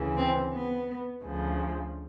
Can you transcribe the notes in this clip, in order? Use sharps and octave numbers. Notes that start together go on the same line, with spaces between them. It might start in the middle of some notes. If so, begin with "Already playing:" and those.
Already playing: D2 C#3 E3
C4
B3
D2 C#3 F3